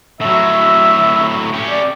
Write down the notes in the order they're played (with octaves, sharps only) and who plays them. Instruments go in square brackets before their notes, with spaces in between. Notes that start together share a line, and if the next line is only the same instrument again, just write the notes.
[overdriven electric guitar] A2 F#3 [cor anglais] E5
[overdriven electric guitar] C#4 G4
[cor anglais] D5